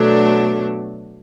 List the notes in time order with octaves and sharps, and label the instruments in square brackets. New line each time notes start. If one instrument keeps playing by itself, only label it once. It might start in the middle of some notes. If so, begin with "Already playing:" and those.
Already playing: [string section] B2 F#3 A3 D4